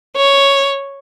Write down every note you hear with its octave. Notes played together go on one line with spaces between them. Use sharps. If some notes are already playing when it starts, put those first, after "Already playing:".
C#5